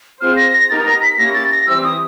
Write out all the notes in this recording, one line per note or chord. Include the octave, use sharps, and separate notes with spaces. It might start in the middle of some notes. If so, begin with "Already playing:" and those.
C4 F4 G#4 C5 F6
A#6
A#6
B3 D#4 G4 A#4 A6
A#6
B6
A#3 C#4 E4 G4 A#6
A6
A#6
E3 G3 C4 E4 G4 E6
D#6